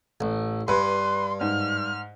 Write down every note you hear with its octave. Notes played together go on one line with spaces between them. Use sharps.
A1
G2 B4 C6
G#2 F6